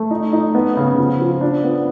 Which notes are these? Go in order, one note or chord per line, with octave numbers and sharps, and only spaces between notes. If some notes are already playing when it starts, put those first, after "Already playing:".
Already playing: A3
D#4
D#4
B3
C#3
F3
F3
D4
B3